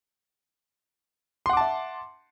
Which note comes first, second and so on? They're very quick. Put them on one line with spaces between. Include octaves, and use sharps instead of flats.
C6 F#5 D6 A5 E5